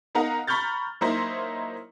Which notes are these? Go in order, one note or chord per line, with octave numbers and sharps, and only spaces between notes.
B3 D#4 A#4 F5 F#5
A#5 B5 C#6 F6 G6 A6
F#3 A#3 D#4 E4 A#4 C5